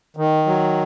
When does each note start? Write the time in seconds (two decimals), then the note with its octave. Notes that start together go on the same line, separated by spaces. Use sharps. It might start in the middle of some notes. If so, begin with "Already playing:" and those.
0.17 D#3
0.46 F#3